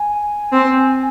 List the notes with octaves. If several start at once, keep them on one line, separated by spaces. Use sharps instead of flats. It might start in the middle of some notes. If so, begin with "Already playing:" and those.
Already playing: G#5
C4